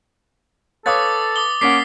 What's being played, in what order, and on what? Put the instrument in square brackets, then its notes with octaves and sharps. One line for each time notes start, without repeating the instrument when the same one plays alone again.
[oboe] A4 [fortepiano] B4 C#5 F5 [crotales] D6 D#6 A6
[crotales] D6 D#6 G7
[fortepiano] A#3 C#4 F#5 [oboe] D6 [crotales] B6 C7